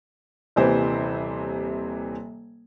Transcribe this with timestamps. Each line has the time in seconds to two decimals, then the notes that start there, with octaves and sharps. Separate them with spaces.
0.56 D#1 C3 E3 C5